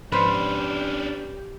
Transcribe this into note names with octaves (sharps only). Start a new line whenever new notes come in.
G#2 F3 G#3 C#4 D4 G4 B4 C5